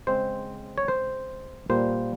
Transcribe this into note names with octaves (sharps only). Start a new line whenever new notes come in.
C#3 G#3 C4 C5
C#5
C5
A#2 G3 A#3 C5